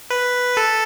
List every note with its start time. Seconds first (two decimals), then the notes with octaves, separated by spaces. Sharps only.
0.10 B4
0.57 A4